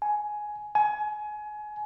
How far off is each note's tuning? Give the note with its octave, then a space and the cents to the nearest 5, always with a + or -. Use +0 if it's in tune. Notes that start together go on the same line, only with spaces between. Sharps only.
G#5 +10
G#5 +25